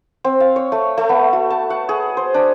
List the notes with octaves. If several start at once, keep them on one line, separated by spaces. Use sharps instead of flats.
C4
F5
C#5
A3
A3
B3
F#4
A5
F#5
G#4
C5
D4